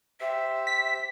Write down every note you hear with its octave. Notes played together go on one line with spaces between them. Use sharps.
G4 C5 E5 E6
B6